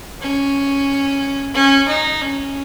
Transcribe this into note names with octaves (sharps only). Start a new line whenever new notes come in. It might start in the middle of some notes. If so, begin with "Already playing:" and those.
C#4
C#4
D#4
C#4